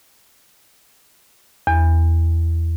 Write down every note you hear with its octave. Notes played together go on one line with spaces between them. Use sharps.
E2